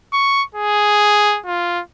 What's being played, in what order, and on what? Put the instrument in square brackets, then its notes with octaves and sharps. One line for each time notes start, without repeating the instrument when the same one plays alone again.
[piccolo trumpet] C#6
G#4
F4